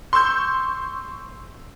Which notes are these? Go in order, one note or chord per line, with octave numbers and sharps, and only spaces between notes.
C6 C#6 E6 G6